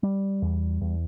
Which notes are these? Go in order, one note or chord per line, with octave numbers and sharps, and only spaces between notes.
G3
E2
E2